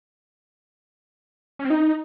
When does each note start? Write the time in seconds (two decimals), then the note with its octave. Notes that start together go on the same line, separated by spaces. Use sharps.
1.59 C#4
1.65 C4
1.70 D#4